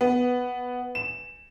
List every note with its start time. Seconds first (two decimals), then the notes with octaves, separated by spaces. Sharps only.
0.01 B3
0.95 E7